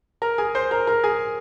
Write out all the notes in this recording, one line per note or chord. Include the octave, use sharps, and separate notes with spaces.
A#4 A#5
G#4 G#5
C5 C6
A#4 A#5
A#4 A#5
G#4 G#5